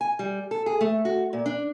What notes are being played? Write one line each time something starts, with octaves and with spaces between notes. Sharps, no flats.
G#5
G3
A4
G#4
A3
F#4
A#2
D4